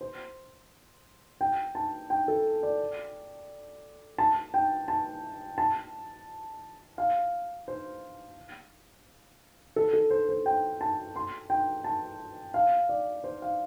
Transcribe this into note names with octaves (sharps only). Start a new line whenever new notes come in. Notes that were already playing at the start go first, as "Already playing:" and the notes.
C5
G5
A5
G5
A4
D5
A5
G5
A5
A5
F5
C5
A4
A4
C5
C5
G5
A5
C6
G5
A5
F5
D5
C5
F5